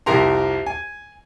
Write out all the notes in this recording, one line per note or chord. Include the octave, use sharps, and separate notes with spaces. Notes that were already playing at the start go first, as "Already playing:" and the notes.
C2 F2 G4 A#4 A#5 C6
G#5